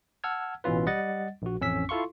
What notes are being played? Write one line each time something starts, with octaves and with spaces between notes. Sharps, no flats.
F#5 A5 E6 F6 G#6
A1 B2 E3 C#4 F4 B4
G3 D#5 F#5 A6
A#1 F#4
A1 F2 C#4 E6 B6
E4 F4 A4 F5 C6 C#6